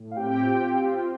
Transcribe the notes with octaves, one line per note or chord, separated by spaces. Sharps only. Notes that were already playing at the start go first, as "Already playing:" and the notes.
Already playing: A2
F5
C4 G4 G5
F4
C4
F4